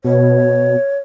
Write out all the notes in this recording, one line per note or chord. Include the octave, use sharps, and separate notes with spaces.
B2 C#5